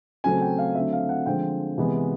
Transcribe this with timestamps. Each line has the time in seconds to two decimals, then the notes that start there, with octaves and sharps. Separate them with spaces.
0.24 C#3 F#3 A3 C4 G#5
0.41 G5
0.58 F5
0.75 D3 F#3 A3 C4 E5
0.93 F5
1.09 F#5
1.26 D3 F3 G#3 C4 G5
1.77 C3 E3 G#3 B3